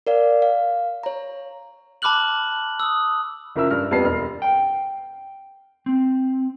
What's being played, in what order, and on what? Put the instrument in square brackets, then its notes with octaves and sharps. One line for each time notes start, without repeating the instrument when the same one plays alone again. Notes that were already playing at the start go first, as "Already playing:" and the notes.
[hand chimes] A#4 D5 F5
F5
C#5 A#5
[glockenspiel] A5 B5 D6 F6 F#6 F#7
D#6 E6
[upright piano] F#1 F3 A#4 E5 E6
G2 F6
F2 G3 B3 G4 A5 C7
E1 F6
[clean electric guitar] G5
C4